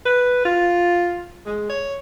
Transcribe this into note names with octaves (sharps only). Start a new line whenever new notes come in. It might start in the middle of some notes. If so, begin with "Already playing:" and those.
B4
F4
G#3
C#5